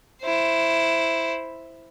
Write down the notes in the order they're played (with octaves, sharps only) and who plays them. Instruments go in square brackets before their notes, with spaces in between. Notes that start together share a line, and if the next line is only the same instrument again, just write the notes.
[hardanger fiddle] E4 C5